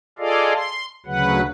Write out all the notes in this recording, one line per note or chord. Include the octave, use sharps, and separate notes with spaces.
F4 G#4 A4 D5 D#5 F5
C6
D2 C#3 F#3 B4 F#5